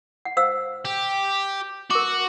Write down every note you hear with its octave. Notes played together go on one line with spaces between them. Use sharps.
F#5
C5 F5 E6
G4
F#4 A#4 D6